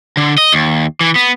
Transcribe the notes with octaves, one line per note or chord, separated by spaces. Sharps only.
D3
D#5
D#2
E3
B3